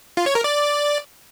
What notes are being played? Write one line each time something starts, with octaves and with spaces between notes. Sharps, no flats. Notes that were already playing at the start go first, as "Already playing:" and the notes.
F4
C#5
A#4
D5